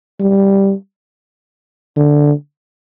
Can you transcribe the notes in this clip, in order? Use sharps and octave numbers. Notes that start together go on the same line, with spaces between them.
G3
D3